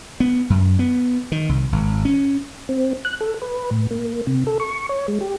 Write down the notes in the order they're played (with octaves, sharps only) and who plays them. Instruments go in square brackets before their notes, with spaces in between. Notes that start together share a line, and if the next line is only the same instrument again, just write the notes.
[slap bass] B3
F#2
B3
D#3
C2
G#1
C#4
[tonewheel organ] C4
F#6
A4
B4
A2
A#3
C3
A4
C#6
C#5
G#3
G4